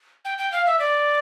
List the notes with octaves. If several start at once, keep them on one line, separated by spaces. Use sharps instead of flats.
G5
G5
F5
E5
D5